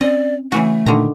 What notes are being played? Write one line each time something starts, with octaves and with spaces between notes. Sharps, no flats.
C4 C#4 D5 D#5
C#3 E3 A3 F#4
A#2 D3 D#3 A#5